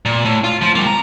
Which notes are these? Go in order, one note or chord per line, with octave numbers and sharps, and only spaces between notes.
A#2
A2
F4
F3
G3 A#3
A#5